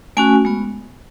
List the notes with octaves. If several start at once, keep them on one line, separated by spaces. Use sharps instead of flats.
A3 C#4 F#4 G#5
G#3 B3